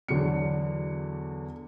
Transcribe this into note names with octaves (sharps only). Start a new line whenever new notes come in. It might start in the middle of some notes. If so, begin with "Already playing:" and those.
E2 D3 F#3 B3 C#7